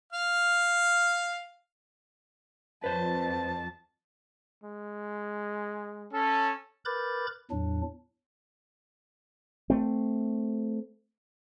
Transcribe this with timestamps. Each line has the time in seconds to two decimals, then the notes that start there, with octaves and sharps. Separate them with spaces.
0.12 F5 F6
2.84 F2 B4 C5 A5
4.64 G#3
6.12 C#4 A4
6.85 A#4 B4 B5 D6 G6 A6
7.51 E2 A2 F#3 D4
9.70 A3 C4